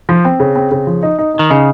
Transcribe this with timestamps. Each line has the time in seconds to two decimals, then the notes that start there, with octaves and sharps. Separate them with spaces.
0.09 F3
0.25 C4
0.40 C#3
0.56 C4
0.71 C#3
0.87 F3
1.03 D#4
1.18 D#4
1.34 D#4
1.39 D#3
1.50 C#3 D#4